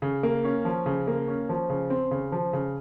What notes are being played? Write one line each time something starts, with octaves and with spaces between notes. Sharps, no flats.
C#3
A#3
C#4
F3
C#3
A#3
C#4
F3
C#3
C4
C#3
F3
C#3